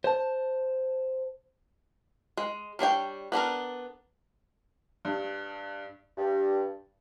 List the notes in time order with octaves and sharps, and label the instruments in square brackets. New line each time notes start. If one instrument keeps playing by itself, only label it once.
[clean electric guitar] C5 A5
[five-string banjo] G#3
G3 D4 C#5 G5
B3 D4 A4 A#4
[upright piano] G2
[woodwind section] G2